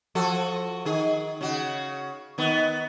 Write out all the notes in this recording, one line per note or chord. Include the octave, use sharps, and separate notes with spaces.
F3 F#4 A4
D#3 G#4
C#3 F#4
D#3 B3